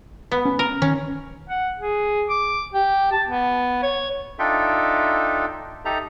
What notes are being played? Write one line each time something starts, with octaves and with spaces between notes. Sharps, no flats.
B3
C#4
A#4
D#3 C#4
F#5
G#4
D6
G4
A5
B3
C#5
D4 D#4 F4 A4 E5 G5
D#4 G4 A4 E5 A#5